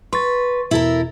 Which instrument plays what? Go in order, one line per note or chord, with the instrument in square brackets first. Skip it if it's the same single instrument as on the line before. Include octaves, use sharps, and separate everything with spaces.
[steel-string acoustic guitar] B4 [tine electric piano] C6 C#6 A6
[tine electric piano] E2 B2 [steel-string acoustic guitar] E4 A4 A#4